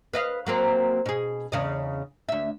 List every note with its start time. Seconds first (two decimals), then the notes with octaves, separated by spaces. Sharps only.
0.13 B4 D#5 F5
0.46 F#3 A#3 C4
1.06 B2 G#4
1.52 E2 C#3 D#5
2.29 D2 E5